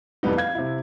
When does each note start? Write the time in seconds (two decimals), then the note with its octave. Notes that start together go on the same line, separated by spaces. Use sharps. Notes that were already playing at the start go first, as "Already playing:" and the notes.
0.23 F2 E3 G3 B3 D#4
0.37 F5 G#6
0.55 C3 E4